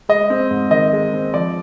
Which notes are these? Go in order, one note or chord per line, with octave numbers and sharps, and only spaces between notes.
G#3 D#5
C4
G#2
D#3 D#5
G#3
C4
F3 D5